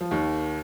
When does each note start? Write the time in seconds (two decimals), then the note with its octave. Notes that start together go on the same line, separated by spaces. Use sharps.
0.01 F3
0.11 D#2 D#3